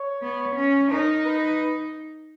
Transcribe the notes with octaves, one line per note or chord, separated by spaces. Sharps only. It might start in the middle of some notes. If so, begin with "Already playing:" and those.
Already playing: C#5
B3
C#4
D#4 A#4
B4